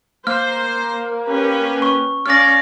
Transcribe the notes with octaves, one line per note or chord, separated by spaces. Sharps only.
A#3 C5 F6
C#4 G4 B4
C#6
C#4 D5 F5 F6 A#6